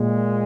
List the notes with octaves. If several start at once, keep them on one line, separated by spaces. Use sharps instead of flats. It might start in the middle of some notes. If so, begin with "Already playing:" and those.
Already playing: A#2 G#3